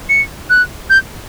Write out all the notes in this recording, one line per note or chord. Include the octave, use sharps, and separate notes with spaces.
C#7
F#6
G6